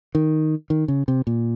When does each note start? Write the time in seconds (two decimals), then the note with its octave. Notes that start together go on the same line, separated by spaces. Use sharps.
0.15 D#3
0.70 D#3
0.88 C#3
1.08 C3
1.27 A#2